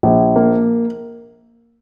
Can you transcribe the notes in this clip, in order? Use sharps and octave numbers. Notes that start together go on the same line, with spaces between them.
A#1
A#3